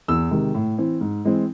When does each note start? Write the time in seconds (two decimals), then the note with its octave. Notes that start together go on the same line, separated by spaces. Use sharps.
0.08 E2 E6
0.31 C3 D#3 G#3
0.54 A2
0.78 E3 C4
1.01 G#2
1.24 E3 G#3 C4